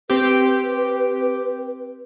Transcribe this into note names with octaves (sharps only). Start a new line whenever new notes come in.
C4 G4 B4